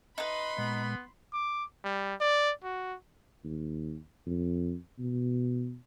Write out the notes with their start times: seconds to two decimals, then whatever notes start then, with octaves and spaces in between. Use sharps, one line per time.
0.18 D#4 B4 B5 C6
0.58 A#2 G#3 B3
1.33 D6
1.84 G3
2.20 D5
2.64 F#4
3.44 D#2
4.26 F2
4.99 B2